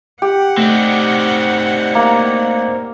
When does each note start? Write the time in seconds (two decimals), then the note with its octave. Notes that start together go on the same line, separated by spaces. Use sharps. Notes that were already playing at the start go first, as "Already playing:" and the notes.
0.22 G4 F#5
0.58 A3 C4 D#4 D5
1.95 A#3 A#5